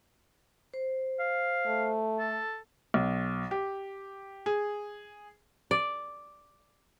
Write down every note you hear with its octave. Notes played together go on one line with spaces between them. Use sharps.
C5
F5
A3
A4
B1
G4
G#4
D5